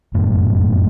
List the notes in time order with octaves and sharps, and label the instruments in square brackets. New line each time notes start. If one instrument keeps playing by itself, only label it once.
[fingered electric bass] F1 F#2 A2